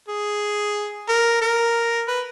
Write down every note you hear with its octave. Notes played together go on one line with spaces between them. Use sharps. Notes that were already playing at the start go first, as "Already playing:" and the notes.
G#4
A#4
A#4
B4